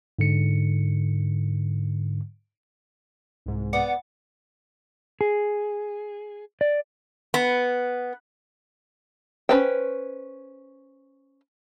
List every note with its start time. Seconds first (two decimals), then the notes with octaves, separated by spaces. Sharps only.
0.19 G#2 D3 C#7
3.46 C2 G#2
3.73 B3 D5 F#5
5.21 G#4
6.61 D5
7.34 B3
9.49 C#4 D4 B4 C5 G5